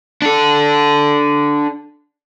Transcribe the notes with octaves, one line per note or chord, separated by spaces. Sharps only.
D4 A4